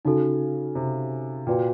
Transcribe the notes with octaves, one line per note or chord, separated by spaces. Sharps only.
C#3 D#4 F#4 A4
C3
A#2 F#4 B4 D5 G5